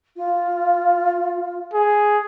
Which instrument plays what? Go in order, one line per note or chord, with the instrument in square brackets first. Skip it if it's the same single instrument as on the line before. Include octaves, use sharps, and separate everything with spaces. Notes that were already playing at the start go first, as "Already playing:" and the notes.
[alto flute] F4
[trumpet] G#4